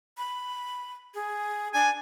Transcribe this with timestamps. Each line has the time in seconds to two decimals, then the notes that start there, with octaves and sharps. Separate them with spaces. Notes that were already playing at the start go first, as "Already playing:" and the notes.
0.18 B5
1.14 G#4
1.74 D4 G#5